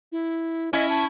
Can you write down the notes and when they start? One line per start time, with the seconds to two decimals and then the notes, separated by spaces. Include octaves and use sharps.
0.12 E4
0.73 C#4 E4 D#5
0.89 A5